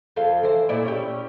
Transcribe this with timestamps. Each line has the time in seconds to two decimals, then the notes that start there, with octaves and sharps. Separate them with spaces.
0.16 F2 A4 F5
0.43 E3 C5
0.69 A#2 E4 D5
0.85 C#4 G4